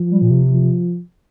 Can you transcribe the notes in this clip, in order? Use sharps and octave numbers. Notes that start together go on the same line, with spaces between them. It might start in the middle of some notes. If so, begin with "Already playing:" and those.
Already playing: F3
G3
A#2
C3
F3